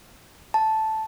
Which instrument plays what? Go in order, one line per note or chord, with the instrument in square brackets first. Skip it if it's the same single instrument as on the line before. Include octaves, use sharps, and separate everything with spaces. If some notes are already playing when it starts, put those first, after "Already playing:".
[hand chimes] A5